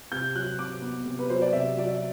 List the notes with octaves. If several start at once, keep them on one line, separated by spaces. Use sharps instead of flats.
C3 G6
F#3 F#6
C3 D6
B3
C3
B4
F#3 C5
D5
C3 E5
F#3 D5
E5